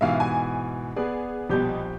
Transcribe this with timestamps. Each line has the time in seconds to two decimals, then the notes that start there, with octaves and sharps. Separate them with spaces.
0.01 G#2 B2 E3 E5 F5
0.20 G#5
0.96 B3 G#4 B4 D5
1.49 A#1 B2 G3 G4 G6